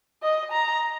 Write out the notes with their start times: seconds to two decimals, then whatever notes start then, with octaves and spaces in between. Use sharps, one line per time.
0.23 D#5
0.52 A#5